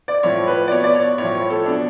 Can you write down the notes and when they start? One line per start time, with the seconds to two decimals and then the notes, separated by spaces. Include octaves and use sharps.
0.08 D5
0.23 A2 F3 C#5
0.47 B4
0.68 D5
0.71 B2 C#5
0.84 D5
0.95 C#5
1.18 A2 C#5
1.24 F3
1.35 C#5
1.50 A4
1.66 B2 D4